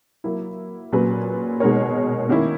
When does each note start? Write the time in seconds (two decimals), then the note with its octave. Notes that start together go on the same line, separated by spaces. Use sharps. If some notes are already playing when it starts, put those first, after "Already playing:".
0.24 F#3 A#3 E4
0.92 A#2 F#3 C#4 G#4 B4
1.60 B2 G#3 D#4 A#4 C#5
2.29 D#3 A#3 C#4 E4